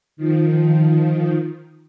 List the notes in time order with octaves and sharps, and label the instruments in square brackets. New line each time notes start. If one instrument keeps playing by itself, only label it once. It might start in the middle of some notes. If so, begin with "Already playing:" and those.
[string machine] D#3 F3